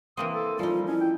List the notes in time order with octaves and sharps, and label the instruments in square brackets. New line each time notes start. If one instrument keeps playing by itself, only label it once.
[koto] E3 A#3 C4 [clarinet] D#6
[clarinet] A4
[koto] F3 D#4 [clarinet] G3 [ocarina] F4
[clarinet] C#4 [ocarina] E4
[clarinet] G5